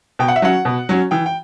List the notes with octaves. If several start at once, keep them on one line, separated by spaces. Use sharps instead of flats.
B2 G5
F#5
E5
F#3 C#4 F#5
B2
F#3 C#4
E3 G5
G5